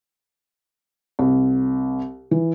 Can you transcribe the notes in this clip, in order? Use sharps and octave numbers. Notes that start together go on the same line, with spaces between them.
C2
E3